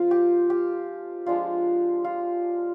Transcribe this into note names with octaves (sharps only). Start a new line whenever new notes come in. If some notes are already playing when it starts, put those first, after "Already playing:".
Already playing: F3 G#3 C4 F4
G4
G4
F3 G#3 D4 F4
F4